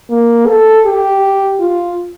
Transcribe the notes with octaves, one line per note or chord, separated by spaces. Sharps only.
A#3
A4
G4
F4